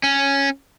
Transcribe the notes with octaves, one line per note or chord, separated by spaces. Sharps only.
C#4